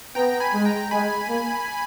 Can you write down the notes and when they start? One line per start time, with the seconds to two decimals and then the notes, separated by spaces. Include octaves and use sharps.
0.15 B3 G5 A#5
0.40 G#5 B5
0.53 G#3
0.65 G5 A#5
0.91 G#3 G#5 B5
1.28 A#3